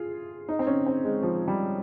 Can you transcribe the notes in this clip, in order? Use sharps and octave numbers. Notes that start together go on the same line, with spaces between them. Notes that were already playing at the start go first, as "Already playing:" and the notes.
Already playing: F4 G#4
D#4
C4
C#4
C4
G#3
F3
G3